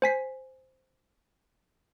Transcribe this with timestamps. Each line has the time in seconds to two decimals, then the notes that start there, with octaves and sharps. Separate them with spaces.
0.02 C5 G#5 B6 C7